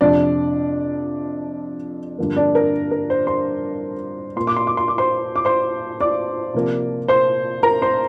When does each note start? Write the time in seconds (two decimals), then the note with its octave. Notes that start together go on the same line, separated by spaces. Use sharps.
0.01 F2 C3 F3 D4 D5
2.18 G2 D3 F3 A#3
2.36 D4 D5
2.55 A#4
2.91 A#4
3.10 C5
3.27 C5 C6
4.36 A#2 A#3 C6
4.47 D6
4.57 C6
4.67 D6
4.77 C6
4.88 D6
4.98 C5 C6
5.36 D6
5.45 C5 C6
6.01 D5 D6
6.54 C3 F3 A#3
7.08 C5 C6
7.63 A#4 A#5
7.82 C5 C6